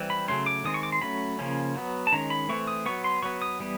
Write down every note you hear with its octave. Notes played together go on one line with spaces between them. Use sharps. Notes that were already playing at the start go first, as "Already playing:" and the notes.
Already playing: E3 G3 C4
B5
C#3 F#3 A3 C#4 C6
D6
D#3 G#3 C4 D#6
C#6
D6
C6
F#3 A3 C#4 B5
C#3 F3 A#3 C#4
F#3 B3
A5
D#3 G#3 C#4 A#5
B5
E3 A3 C4 C#6
D#6
F#3 B3 C#6
C6
F#3 B3 C#6
D#6
E3 G3 B3